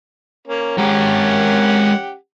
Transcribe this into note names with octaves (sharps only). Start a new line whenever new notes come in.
A#3 C#4
G#3 C#4 G4 A#4 F#5